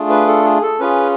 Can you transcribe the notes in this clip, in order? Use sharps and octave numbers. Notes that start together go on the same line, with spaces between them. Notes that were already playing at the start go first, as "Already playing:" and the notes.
Already playing: A3 D4 F4 G#4
B4
A4
G#4
A4
C#4 F4 G#4 B4